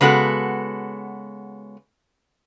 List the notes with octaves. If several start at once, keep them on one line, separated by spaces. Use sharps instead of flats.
C#3 G#3 B3 F#4 A4